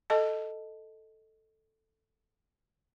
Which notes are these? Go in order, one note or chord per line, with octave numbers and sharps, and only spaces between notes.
A4 D#5 A5